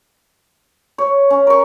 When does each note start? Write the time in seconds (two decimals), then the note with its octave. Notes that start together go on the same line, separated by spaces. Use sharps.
0.98 C#5
1.30 C#4
1.47 A#4 C#6